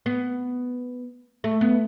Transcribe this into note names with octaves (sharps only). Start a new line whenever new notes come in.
B3
A3
B3